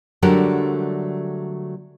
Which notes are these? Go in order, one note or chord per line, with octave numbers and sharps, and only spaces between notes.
D3 F#3 G3 A3 A4 A#4